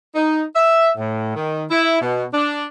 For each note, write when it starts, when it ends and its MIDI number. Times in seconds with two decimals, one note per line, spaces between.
0.15 0.42 63
0.55 0.90 76
0.98 1.33 45
1.36 1.64 51
1.71 2.01 64
2.01 2.25 47
2.33 2.65 62